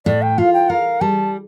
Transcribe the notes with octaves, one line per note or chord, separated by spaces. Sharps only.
A2 D5
G5
F4 F5
G5
A#4 F5
G3 A5